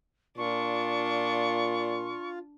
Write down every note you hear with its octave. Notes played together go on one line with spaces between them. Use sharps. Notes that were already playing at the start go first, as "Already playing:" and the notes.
A#2 D4 F4 C#6